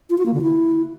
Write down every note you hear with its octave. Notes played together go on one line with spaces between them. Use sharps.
F4
F#4
A#3
D3
E4